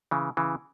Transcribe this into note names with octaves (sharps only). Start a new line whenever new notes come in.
C#3 E3
C#3 E3